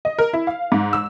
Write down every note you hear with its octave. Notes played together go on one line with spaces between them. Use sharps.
D#5
A#4
E4
F5
G#2
E6